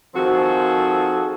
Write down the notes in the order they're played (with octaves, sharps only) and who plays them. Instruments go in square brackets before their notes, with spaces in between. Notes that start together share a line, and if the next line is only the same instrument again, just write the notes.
[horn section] D#3 F3 C4 F#4 G#4 A4